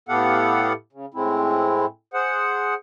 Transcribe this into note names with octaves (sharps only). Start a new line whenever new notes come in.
A2 B3 G4 A4 F5 F#5
C#3
A2 G#3 C4 E4
G#4 C5 F#5